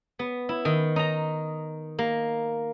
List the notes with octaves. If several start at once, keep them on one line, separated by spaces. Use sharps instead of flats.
B3
E4
D#3
D#4 A#5
A#3